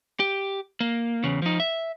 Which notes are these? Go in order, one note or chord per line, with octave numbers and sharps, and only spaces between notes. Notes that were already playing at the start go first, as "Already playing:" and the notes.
G4
A#3
E2 C#3
F3 D#4
E5